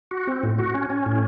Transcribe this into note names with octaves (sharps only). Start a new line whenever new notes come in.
F#4
C4
A2
F#4
C#4
C#4
A2